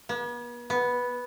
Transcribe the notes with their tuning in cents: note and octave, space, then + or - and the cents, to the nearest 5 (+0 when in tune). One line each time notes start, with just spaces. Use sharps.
B3 -40
B3 -5